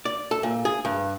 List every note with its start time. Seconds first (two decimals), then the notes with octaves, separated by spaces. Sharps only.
0.05 D5
0.31 A4
0.43 A#2
0.65 G#4
0.85 G2